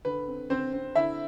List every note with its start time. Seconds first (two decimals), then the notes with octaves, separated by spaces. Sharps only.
0.05 D3 B4
0.28 C4
0.50 D3 C4 C5
0.73 C4
0.95 D3 E4 E5